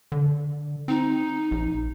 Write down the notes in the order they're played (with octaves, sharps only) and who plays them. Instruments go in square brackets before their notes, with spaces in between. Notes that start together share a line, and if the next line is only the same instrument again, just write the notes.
[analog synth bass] D3
[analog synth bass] C4 [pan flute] D#4
[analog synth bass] A#1